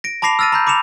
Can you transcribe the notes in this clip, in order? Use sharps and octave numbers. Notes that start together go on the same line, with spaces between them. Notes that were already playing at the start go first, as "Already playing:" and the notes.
A#6 D7
A5 B5 D6 A#6 C7 F7
E6 F6 A6 A#6 D#7
A#5 B5 G6
B5 D6 C#7 E7 F7